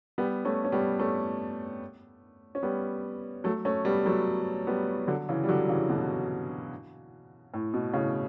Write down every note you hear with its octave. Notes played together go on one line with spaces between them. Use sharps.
G3 B3
A3 C#4
C#4
G3 B3
A3 C#4
C#4
G3 B3
F#3 A3
A3 C#4
G3 B3
F#3 A3
G3 B3
D3 F#3
C#3 E3
G3
D3 F#3
C#3 E3
B2 D3
A2
B2
A2 C#3